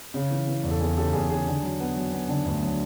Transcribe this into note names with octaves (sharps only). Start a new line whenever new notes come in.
C#3
E3
E3
E2
A4
E2 G#4
C#3 G4 A4
E2 G#4
C#3 G#4
D3
F#3
B3
F#3
B3
D3
D2
F#3